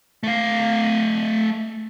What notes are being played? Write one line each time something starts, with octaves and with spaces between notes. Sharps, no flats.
A3 F5